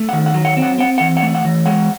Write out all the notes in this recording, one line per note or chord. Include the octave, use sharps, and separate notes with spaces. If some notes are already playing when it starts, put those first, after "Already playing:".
Already playing: A3
F#5
D#3
F#5
F#3
F#5
C4
F#5
C4 F#5
E3 F#5
F#5
A3
F#5
E3
G#3 F#5